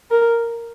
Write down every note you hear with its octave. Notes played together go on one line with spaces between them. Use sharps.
A#4